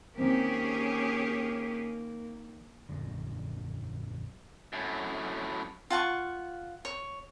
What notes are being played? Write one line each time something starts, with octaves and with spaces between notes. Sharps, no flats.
D#3 G#3 A#3 C4 C#4 G4 G#4
A#1 F#2 D3
F#2 A2
F4 F#5 A5 C#6
C#5